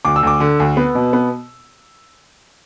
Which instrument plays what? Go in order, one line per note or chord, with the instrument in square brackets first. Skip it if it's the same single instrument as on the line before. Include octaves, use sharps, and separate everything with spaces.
[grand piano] D2 D6
E6
D2 D6
D3
D2
B3
B2
B3